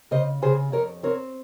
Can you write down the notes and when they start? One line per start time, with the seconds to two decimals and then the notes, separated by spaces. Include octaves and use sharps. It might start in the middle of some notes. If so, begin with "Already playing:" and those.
0.11 C#3 C5 D#5
0.42 C#3 G#4 C5
0.72 F2 A#4 C#5
1.03 C4 A#4 C#5